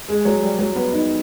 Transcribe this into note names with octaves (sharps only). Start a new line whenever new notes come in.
G#3
F#3
G3
F#3
B3
D#4